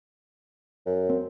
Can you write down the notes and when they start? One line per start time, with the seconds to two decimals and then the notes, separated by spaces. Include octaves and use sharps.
0.86 F#2
1.09 C4